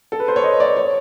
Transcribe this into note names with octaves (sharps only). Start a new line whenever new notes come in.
A4
B4
C5
C#5
D#5
D5
C#5